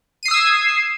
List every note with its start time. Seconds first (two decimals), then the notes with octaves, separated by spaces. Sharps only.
0.23 D#7
0.25 C7
0.28 D#6
0.31 E6
0.34 G#6